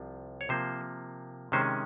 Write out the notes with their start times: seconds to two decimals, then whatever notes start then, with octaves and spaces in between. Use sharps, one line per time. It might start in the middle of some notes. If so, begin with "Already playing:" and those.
Already playing: C2 C3 F3 F4
0.41 C#5
0.49 C3 F3 A#3 C5
1.52 C3 D#3 G#3 C#4 C5